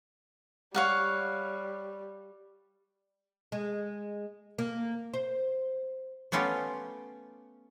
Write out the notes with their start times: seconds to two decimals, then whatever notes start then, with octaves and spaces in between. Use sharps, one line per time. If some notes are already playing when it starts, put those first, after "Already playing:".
0.75 G3 C#5 F5 F#5
3.52 G#3
4.58 A#3
5.14 C5
6.32 A3 B3 C#4 F4 G4